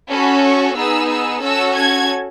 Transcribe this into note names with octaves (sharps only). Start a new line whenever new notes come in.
C#4 F#4 A4 B5
C#6
B3 D#4 G#4 E6
E6
C#4 F#4 A4 E6
G#6